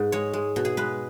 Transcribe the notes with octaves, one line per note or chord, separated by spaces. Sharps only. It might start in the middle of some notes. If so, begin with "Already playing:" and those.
Already playing: G#2 G#4 B4
G#3 C#5
G#3
B2
G#4
G#3 B4